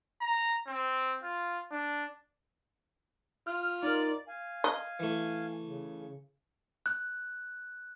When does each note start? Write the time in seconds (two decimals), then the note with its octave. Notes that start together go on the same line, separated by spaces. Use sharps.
0.21 A#5
0.67 C4
1.23 F4
1.71 D4
3.47 F4 F6
3.83 D#4 A#4 D5
4.28 F5 G#5
4.64 D#5
4.99 E3 A3
5.63 C#3
6.86 F#6